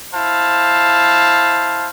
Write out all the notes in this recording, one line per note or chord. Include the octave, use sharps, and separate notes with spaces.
E4 C5 F5 A5